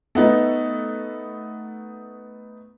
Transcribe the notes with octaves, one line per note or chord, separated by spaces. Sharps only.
A3 B3 D#4